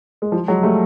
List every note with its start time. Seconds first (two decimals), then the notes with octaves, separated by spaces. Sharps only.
0.22 G#3
0.32 F3 G3
0.48 F#3 G#3
0.63 G3 A3